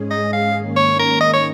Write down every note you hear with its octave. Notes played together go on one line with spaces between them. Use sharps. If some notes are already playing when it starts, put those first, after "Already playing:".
Already playing: G#2 G#3 C#4 G#4
D#5
F5
G#2 D#3 A#3 C#4
C#5
A#4
D#5
C#5